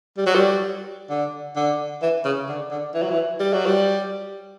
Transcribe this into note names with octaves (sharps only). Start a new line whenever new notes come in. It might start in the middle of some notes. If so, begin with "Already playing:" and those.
G3
F#3
G3
D3
D3
E3
C#3
D3
D3
E3
F#3
E3
G3
F#3
G3